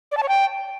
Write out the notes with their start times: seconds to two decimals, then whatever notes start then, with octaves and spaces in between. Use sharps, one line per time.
0.12 D5
0.17 A5
0.23 C#5
0.28 G5